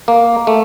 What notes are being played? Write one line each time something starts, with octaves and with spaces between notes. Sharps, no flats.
A#3
A3